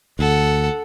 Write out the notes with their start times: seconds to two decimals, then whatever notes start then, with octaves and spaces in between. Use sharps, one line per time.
0.19 D2 A4 F#5